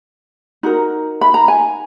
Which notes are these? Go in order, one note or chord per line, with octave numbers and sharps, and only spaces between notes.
D#4 F#4 A#4
B5
A#5
G#5